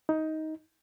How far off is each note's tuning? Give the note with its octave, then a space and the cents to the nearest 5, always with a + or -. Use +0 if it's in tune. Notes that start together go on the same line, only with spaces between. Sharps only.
D#4 +15